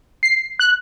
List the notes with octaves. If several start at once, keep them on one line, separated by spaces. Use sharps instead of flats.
C7
F#6